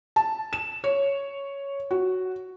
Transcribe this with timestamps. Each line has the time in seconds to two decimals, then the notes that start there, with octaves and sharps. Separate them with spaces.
0.16 A5
0.53 E7
0.84 C#5
1.91 F#4